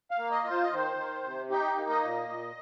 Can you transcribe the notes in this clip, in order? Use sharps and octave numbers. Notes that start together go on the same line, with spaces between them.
F5
A#3
D#5
F4
C5
D#5
D#3 C5
D#3
C3
D#4 G4
A#3
D#5
A#2
A#2